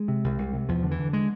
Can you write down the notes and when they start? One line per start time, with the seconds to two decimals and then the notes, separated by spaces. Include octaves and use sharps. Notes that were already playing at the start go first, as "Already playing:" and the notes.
Already playing: G#3
0.08 C3
0.24 C2
0.38 C2
0.53 C3
0.69 E2 F3
0.83 D3
0.91 E3
0.99 D3
1.13 G#3